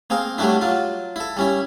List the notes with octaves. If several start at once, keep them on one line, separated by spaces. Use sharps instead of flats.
A#3 C4 G#4 A#4
F#3 G3 A3 D4 E4
F#3 F4
E4 A4
G3 C#4 E4